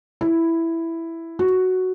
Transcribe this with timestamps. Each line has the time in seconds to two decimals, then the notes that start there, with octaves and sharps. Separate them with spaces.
0.21 E4
1.39 F#4